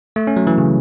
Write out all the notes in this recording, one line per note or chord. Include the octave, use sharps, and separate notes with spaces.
A3
C#4
F#3
E3
C#3